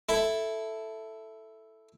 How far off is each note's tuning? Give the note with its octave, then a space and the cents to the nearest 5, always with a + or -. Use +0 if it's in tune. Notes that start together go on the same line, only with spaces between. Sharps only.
E4 +0 A4 +0